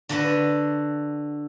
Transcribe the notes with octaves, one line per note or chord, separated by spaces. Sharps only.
D3 D4 F#4 B4